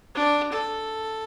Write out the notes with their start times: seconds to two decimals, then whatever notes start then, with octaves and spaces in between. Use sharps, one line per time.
0.15 D4
0.52 A4